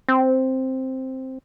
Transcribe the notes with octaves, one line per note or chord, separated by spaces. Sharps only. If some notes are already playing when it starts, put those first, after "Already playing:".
C4